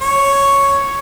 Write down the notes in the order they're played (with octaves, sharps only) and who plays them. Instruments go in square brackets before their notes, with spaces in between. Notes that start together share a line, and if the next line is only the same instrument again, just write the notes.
[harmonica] C#5